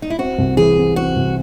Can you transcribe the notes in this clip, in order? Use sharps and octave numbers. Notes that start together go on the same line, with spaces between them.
D#4
E4
C4 F#4
C2
E3 G#4
C3
C4 F#4
C2